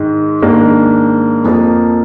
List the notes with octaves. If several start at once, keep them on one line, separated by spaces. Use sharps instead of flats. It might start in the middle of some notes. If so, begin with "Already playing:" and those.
Already playing: G#2 D#3 G#3
G#2 D#3 A#3 D4
F2 F3 A#3